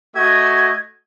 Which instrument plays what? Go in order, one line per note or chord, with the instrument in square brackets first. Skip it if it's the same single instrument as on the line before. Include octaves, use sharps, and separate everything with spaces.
[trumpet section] A3 F#4 D#5 [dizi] G#6